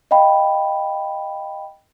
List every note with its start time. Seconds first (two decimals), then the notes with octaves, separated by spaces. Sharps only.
0.11 D#5 F5 G5 B5